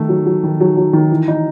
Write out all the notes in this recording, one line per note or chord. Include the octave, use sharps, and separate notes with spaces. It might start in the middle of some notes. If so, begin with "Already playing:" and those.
Already playing: D#3 A3
F#3
F#3
D#3
F#3
F#3
D#3
E3
D#4